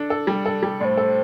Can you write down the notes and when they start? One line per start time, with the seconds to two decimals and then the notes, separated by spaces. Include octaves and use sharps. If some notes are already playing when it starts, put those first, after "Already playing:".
Already playing: D4 A4
0.10 A4
0.27 G3
0.46 A4
0.63 G3
0.80 A2 C5 D5
0.97 A4